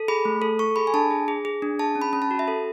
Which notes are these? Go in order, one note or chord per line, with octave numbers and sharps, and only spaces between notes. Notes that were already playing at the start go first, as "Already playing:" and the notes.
Already playing: A4
G#4 B5
A3
A4
A4 C#6
G#4 B5
G#5
D4 A5
G#4
G#4
G#4
D4
G#4 A5
C#4
B5
C#4 B5
A5
F#4
E5
A4